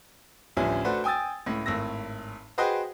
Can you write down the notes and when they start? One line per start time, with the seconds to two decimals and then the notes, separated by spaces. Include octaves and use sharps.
0.57 A1 D2 F3 G3 C#4 G#5
0.84 A3 D4 F#4 B4 C5
1.04 G5 G#5 D#6 E6 A6
1.46 C#2 A2
1.66 G#1 A2 E6 A#6
2.58 F#4 G#4 B4 C5 D#5 G5